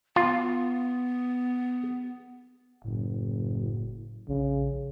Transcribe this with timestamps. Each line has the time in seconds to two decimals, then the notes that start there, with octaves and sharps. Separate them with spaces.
0.16 B3 F4
2.84 F#1 A2
4.28 A#1 C#3